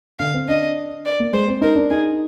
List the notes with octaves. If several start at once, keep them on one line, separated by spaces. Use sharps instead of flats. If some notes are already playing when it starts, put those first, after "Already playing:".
D3 F5
C4
D4 D#5
D5
A#3
G#3 C5
C4
D#4 A#4
D4
D#4 G#4